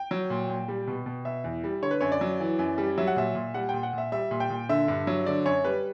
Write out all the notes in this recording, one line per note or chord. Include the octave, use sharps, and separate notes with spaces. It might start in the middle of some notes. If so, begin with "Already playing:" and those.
Already playing: G5
F#3
A#2
A#2
G3
B2
B2
B2 E5
E2
G3
D3 C#5
B4
F#2 C#5
D5
F#3
E3
F#2
G3
F#3 E5
F#5
A#2 E5
A#2
G3 F#5
A#2 G5
F#5
A#2 E5
G3 E5
A#2
G5
A#2
D3 E5
G2
F#3
D3 D5
F#2 C#5
G3 B4